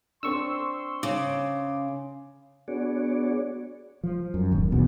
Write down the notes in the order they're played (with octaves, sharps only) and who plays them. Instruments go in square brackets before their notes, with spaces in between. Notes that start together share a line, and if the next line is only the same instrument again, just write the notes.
[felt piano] C4 D4 [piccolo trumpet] C6 [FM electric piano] C#6 E6
[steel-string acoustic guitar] C#3 [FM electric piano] D6
[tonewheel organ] B3 D4 F#4 G#4 C#5 D5
[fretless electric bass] F3
F#2
D1 D#2
F1 B1 E2 B2